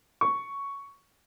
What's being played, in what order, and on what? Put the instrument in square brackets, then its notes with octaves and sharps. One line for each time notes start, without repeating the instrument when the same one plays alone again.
[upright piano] C#6